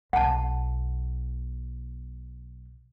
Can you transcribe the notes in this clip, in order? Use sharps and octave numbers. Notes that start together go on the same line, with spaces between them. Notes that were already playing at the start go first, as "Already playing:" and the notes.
B1 F#5 A5